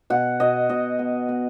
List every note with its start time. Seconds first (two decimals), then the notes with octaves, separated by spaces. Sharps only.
0.10 B2 F#5
0.40 B2 D#5
0.69 B2 D#5
0.99 B3
1.29 B3